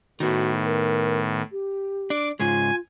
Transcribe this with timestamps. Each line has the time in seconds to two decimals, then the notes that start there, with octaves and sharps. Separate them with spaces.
0.20 A2 D#3 B3 F#4
0.65 A#4
1.52 G4
2.10 D4 D6
2.40 G#2 C#3 G#3 F4 G#5